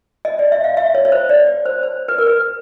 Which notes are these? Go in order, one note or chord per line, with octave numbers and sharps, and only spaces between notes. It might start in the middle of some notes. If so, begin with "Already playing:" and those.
D#5
D5
E5
F5
E5
C#5
C#5
C5
D5
D5
C5
C5
B4
A#4
B4